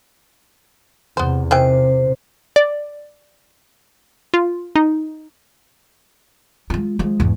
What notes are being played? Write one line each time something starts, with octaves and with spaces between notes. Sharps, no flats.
E2 C3 B3 C5
C3 D#3 E3 C5 G5
D5
F4
D#4
G#3 F4
F3 G#3
E2 G#2